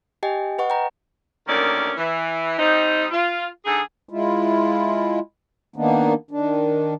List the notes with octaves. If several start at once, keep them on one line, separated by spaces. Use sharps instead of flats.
G4 D#5 G5 G#5
B4 D#5 F#5 C#6
G5 A#5
D2 D#3 A#3 C#4 D5
E3
G3 C4 D#4
F4
D3 D#4 G#4
G#3 E4 F4
D#3 A#3 B3 D4 D#4
D#3 D4